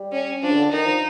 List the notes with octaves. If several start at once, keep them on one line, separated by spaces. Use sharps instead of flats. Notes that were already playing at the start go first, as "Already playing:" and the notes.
Already playing: G3
C#4
F3 D4
C#3
D3
D#3 D#4
F3